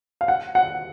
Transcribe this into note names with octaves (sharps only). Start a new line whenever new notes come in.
F5
F#5
F#5